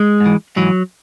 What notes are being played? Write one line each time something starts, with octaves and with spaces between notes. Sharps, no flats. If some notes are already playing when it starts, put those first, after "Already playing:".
Already playing: G#3
G#2
E3
G#2 E3 F#3